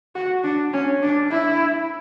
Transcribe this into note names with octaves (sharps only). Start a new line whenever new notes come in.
F#4
D4
C#4
D4
E4